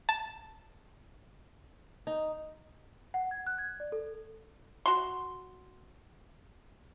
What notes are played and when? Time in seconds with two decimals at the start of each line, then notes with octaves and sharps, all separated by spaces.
0.09 A5
2.07 D#4
3.14 F#5
3.31 G#6
3.47 F#6
3.58 G#6
3.80 D5
3.92 A4
4.86 F#4 C6